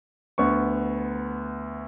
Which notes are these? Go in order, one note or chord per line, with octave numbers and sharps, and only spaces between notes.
D2 B3 C#6